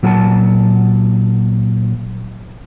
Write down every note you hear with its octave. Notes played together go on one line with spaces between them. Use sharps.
A#2 F#3 F4 A#4 F#5 A5